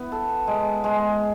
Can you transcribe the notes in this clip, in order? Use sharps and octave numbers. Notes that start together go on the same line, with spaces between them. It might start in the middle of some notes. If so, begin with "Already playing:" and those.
Already playing: B3 E4
A4
G#3
G#3